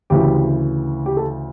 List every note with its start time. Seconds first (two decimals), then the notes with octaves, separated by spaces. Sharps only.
0.10 D2 C#3 E3 G4
1.06 G4
1.17 A4